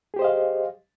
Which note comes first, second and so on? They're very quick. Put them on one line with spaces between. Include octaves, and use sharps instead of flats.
G#4 G4 C5 D#5 F5